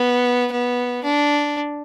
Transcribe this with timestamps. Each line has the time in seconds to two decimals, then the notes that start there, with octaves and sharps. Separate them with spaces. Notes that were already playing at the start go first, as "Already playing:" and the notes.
Already playing: B3
0.51 B3
1.04 D4